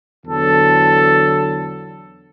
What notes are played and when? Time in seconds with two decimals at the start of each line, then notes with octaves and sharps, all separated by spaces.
0.24 E2 D3 F#3 A4